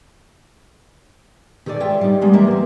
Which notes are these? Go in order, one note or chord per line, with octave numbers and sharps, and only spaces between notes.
D#3 G#4 A4 B4 D5
G#2 F4 C#5 E5 G5
G3 D#4
D#3 G3 G#3 B3 C#4 D4
E2 G3 G#3 A#3 A#4 E5
E2 C4